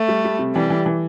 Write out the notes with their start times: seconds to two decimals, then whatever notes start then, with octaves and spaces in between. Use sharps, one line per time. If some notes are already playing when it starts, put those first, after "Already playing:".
Already playing: A3
0.08 G3
0.25 G3
0.39 C3
0.55 E3 G3
0.70 E3
0.86 E3